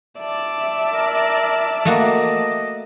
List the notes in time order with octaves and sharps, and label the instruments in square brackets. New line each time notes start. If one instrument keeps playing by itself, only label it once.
[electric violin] D5 A5 [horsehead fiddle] E5
[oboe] A#4
[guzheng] A3 A#3 F#4 [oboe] D#5